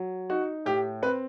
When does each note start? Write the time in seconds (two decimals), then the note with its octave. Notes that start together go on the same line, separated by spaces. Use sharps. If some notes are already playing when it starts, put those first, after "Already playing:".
Already playing: F#3
0.30 D#4 F#4
0.66 A2 G4
1.03 C4 B4